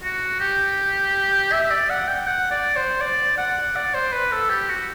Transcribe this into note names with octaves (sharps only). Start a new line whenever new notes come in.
F#4
G4
E5
D5
F#5
G5
F#5
D5
C5
D5
F#5
D5
C5
B4
A4
G4
F#4